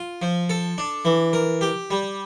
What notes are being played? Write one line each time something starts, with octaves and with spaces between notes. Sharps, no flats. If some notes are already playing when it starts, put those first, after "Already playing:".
Already playing: F4
F3
A4
D4
E3
A#4
G4
G3